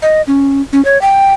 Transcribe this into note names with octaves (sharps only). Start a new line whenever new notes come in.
D#5
C#4
C#4
C#5
G5